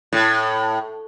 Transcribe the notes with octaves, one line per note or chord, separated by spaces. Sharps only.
A2